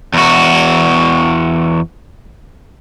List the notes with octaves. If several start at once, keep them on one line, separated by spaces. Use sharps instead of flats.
E2 F#4